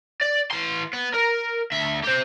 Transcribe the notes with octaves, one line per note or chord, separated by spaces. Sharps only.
D5
E3 C6
B3
A#4
D2 E5
G4 C5